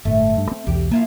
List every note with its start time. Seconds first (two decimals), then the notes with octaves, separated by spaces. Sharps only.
0.05 G1 A2 A3
0.37 G2
0.52 C4
0.67 B1 E2 G4
0.91 F3 A#3 E4 F4